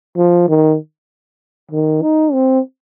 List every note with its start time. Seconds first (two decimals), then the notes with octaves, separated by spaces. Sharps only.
0.16 F3
0.48 D#3
1.71 D#3
2.02 D#4
2.33 C4